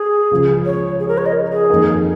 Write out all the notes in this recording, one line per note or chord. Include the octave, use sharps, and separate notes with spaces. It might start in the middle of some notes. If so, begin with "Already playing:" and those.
Already playing: G#4
C#2 C#3 F3
C#5
G#4
A#4
C#5
D#5
G#4
F2 D#3 A#3 D#4 A#4